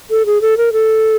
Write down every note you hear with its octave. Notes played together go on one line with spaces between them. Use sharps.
A4
G#4
A4
A#4
A4